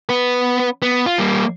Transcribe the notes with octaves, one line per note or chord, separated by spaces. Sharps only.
B3 B4
B3
F4
G3 A#3